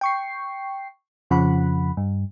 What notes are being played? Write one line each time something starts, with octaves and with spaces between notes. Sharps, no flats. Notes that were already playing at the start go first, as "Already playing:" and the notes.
G5 C#6 C7
F2 C#3 F3 F#5 B5
G2